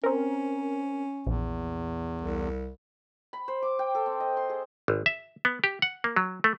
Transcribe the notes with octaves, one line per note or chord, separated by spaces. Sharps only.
C4 C#4 A#4
A#1 E2
C2
B5
C5
D6
G5
A4
C4
D#5
C6
G#4
G#1
E5
B3
G4
F#5
A#3
F#3
A3